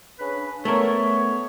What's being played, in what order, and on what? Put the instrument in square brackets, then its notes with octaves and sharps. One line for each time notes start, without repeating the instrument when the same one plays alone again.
[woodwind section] C#3 D4 B4
[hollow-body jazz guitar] A3 A#4 [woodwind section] B3 C#5